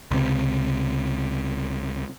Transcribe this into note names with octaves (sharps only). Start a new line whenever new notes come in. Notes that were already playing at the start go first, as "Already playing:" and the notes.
C#2 C3